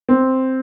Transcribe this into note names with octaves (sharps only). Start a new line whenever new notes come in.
C4